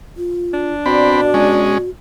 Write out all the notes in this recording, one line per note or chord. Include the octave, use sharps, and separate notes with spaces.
F4
D4
B2 C4 F#4 D5 B5
G#3 C#4